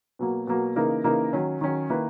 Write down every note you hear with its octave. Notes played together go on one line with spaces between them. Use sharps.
B2 F#3 A#3
B2 F#3 A#3
C#3 E3 A#3 D#4 A#4
C#3 E3 A#3 D#4 A#4
D#3 F#3 C#4
D#3 F#3 C#4
D#3 A#3 E4 B4